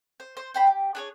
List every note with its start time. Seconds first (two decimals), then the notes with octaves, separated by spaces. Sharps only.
0.20 C5
0.37 C5
0.54 C5 G5 B5
0.67 G4
0.95 D4 G#4 C#5